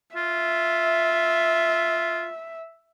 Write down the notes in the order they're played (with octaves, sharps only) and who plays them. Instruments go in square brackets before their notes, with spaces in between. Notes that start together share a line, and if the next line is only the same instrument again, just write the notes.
[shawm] F4 [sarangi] E5